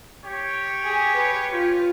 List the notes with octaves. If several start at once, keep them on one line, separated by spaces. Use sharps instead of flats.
G4 C#5
G#4
B4
F4